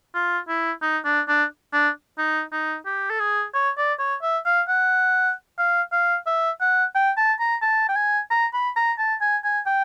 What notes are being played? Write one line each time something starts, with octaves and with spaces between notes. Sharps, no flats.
F4
E4
D#4
D4
D4
D4
D#4
D#4
G4
A4
G#4
C#5
D5
C#5
E5
F5
F#5
F5
F5
E5
F#5
G5
A5
A#5
A5
G5
G#5
A#5
B5
A#5
A5
G#5
G#5
G5